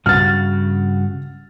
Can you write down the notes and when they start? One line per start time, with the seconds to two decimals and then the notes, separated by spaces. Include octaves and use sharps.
0.06 G2 C#3 F#4 F6 A6